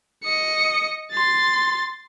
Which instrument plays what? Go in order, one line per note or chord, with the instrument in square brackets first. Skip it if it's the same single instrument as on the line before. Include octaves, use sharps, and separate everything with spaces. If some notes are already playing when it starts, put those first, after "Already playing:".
[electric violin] D#5 C#7
C6 A6